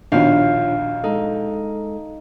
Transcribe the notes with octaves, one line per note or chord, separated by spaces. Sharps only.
A#1 D#2 B2 D4 F4 C#5 F5
G#3 D#4 A4